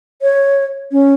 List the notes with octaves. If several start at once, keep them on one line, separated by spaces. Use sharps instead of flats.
C#5
C#4